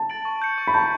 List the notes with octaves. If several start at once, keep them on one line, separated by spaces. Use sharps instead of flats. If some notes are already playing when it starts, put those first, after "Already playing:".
Already playing: A5
A6 D7 F#7
C#6
G6 C#7
C#6
B5
A5 G6 C#7